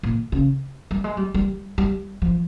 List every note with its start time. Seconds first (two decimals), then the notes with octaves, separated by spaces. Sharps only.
0.03 A#2
0.32 C#3
0.91 G3
1.04 G#3
1.17 G3
1.34 G3
1.78 G3
2.22 F3